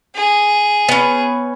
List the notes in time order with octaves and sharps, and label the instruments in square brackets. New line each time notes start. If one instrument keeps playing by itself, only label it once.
[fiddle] G#4
[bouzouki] B3 C#4